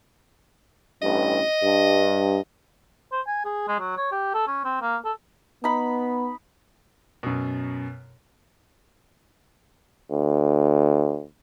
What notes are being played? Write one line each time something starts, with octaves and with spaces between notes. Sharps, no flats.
A1 G2 D#5
G2
C5
G#5
G#4
G#3
F#3
C#5
G4
A4
C#4
C4
A#3
A4
B3 D#4 B5
F#2 B2
D2